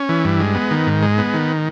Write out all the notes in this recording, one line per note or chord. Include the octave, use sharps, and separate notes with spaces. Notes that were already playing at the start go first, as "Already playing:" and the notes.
Already playing: C#4
E3
G2
G#3
B3
D#3
G#2
G#3
B3
D#3